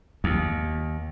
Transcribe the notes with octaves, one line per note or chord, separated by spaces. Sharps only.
D#2